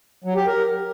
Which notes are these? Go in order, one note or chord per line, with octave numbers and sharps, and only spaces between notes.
F#3
G4
A#4